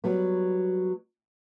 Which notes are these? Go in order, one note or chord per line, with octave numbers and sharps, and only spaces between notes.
F#3 G3 B3